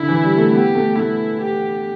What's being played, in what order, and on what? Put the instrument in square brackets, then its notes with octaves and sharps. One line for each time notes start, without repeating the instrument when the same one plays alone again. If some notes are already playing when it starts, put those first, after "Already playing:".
Already playing: [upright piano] D3 [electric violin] E4
[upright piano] E3
G3
A3
[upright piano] B3 [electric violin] G4
[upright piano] A3
[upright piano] A3 [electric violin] E4
[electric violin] G4